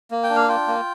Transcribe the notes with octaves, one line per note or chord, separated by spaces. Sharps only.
A#3
G5
D4
F5
F4 G5
A#3